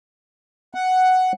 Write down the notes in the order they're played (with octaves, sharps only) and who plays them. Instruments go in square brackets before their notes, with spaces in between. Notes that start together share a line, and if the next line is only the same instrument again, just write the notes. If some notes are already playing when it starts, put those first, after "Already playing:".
[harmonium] F#5